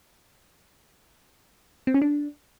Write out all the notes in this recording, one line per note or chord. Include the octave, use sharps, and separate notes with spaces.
C4
C#4
D4